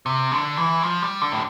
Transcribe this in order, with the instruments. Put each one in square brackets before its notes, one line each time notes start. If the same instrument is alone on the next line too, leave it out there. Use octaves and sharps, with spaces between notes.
[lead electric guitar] C3
D3
E3
F3
G3
D3
A2